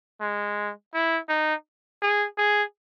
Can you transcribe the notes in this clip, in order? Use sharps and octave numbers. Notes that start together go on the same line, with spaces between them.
G#3
E4
D#4
G#4
G#4